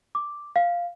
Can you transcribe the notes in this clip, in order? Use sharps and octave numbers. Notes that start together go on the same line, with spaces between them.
D6
F5